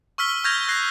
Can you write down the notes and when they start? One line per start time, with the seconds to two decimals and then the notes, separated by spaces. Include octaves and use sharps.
0.18 C#6 E6 F6 B6 G7
0.44 C#6 F6 G6 G#6 A#6 F7
0.68 F#6 G#6 A#6 C7